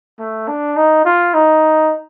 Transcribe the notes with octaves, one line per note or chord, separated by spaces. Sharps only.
A3
D4
D#4
F4
D#4